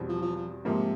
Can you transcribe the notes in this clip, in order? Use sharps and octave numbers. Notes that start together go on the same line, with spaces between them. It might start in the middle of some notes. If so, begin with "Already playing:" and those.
Already playing: E2 B2 G3 C4
F3
F3
F3
G#2 C3 F3 A#3